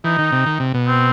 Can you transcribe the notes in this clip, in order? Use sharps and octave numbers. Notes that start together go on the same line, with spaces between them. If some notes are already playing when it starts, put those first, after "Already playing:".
E3 D#4
D#3
C3
D#3
C3
B2
C4